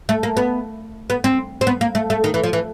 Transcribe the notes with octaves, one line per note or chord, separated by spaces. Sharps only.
A3
A#3
B3
B3
C4
C4
B3
A#3
A3
A3
D#3
E3
F3
E3